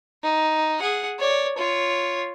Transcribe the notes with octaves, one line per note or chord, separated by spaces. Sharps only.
D#4
G#4 F#5
C#5 D5
F4 C#5